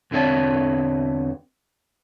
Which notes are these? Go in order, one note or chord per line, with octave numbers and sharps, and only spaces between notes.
E2 D3 C4 C#5 A5